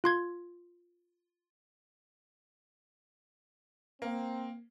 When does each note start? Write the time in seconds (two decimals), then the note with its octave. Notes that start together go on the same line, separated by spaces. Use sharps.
0.04 F4 C6 G#6
4.02 A#3 C4